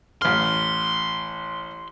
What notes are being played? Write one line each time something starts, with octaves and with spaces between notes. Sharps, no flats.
A1 C6 F6